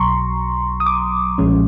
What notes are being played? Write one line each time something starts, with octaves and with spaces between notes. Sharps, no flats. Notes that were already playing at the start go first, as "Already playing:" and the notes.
Already playing: B1 B2 F#3 A#5 C6 C#6
D#6
D6
B1 A#2 F3 G#3 C#4